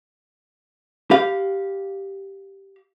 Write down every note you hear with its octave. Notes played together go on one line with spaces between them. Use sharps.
G4 F5